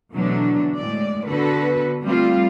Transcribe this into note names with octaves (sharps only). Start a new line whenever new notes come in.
B2 D3 E3 F#3 A3 D4
A2 G#3 D5
D3 B3 F#4 A4 B4
G3 A3 C4 F4